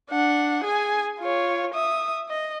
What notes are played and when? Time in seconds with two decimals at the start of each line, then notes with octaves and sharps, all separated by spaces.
0.11 D4 F#5
0.64 G#4 G#5
1.19 F4 C#5
1.74 E5 D#6
2.29 D#5